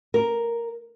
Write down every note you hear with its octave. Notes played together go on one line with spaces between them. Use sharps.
A#4